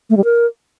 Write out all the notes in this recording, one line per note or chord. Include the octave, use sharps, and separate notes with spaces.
A3
G3
A#4